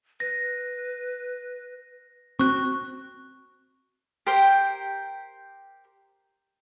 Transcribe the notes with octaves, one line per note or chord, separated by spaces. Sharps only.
B4 A#6
C4 F#4 C#6 F#6
G4 A#4 C5 G5